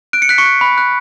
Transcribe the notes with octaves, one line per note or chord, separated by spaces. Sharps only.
F#6 D7
C#7
F#6 B6
C#6 C#7
F#6
B5
F#6